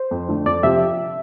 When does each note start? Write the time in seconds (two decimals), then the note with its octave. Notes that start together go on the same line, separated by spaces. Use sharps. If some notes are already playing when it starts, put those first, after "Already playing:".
Already playing: C5
0.11 F2
0.29 D3 A3
0.46 F2 D5
0.63 C3 F3 C4 G4 E5